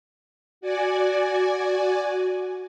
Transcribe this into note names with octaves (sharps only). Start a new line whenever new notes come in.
F#4 D5 G#5